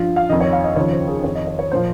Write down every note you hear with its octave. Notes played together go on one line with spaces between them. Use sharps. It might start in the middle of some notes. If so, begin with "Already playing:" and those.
Already playing: G2 F3 F4
F5
F2 D#3 D#5
C#5
F5
D#5
D#2 C#3 F3 C#5
C5
G#4
F2 D#3 C#5
D#5
C#5
C#5
A#2 F3 C5